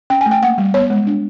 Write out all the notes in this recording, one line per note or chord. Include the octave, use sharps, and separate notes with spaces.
C#4 G5
A3 G#5
G5
A#3 F#5
G3
B3 C#5
G#3
D4